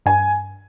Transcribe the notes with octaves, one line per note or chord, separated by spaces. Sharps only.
G2 G#5